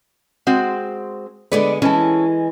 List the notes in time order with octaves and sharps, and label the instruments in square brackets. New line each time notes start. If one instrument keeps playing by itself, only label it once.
[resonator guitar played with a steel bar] G#3 C4 F#4
[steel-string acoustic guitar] D3 G#3 B3 [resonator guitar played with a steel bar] B4 D5
[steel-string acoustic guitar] E3 G#3 [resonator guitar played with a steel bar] C#4 A4